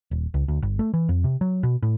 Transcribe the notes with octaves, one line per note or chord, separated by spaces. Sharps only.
D#1
C#2
D2
G1
A3
E3
F2
C3
F#3
B2
A2